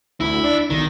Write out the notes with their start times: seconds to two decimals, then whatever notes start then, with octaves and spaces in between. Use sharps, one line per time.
0.21 D2 E4
0.44 D4
0.70 B1 D#3